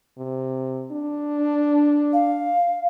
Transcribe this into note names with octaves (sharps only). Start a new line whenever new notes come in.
C3
D4
F5